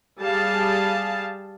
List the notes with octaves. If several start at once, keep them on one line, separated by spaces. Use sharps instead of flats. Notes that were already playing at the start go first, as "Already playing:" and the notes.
G3 G#4 F5 A5